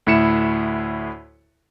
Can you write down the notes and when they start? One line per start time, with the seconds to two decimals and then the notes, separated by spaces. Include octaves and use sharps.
0.06 D2 A2 E4 C#7 E7